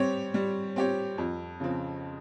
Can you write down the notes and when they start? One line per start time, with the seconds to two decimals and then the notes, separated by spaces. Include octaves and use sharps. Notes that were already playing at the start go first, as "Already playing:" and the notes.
Already playing: G3 C4 G4 C#5
0.34 G3
0.76 C4 G4 C#5
1.18 F2
1.60 C#3 F3 C4